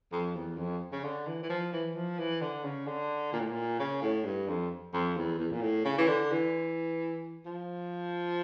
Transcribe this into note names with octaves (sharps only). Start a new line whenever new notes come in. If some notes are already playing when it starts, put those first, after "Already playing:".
F2
E2
F2
C#3
D3
E3
E3
F3
E3
F3
E3
D3
C#3
D3
A#2
A2
A#2
C#3
A2
G2
F2
F2
E2
E2
A#2
A2
C#3
E3
D3
E3
F3